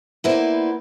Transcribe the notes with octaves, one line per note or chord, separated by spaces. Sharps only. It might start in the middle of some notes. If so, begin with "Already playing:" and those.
A#3 B3 E4 B4 C5 D5